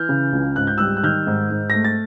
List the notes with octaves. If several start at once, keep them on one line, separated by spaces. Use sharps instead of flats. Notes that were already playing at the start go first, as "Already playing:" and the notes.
Already playing: E3 F6 G6
C#3
C#2
G#2 F#6
G6
G3 E6 F#6
F#6
D#3 F6 G6
G#2
G#2
A3 A#6
A6